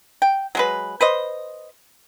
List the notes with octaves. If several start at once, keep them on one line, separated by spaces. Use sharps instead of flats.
G5
F#3 G#3 B4
B4 C5 D#5